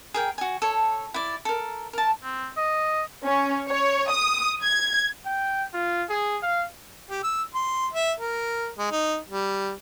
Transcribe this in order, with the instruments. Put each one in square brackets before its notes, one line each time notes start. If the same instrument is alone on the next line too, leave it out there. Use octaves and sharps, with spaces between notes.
[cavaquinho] G#4 A#4 G5
F#4 G#5
A4 C#5
E4 D5
A4 A#4
A#4 A5
[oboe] C4
D#5
[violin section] C#4
C#5
D#6
G#6
[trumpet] G5
F4
G#4
F5
[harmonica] G4
E6
C6
E5
A#4
G#3
D#4
G3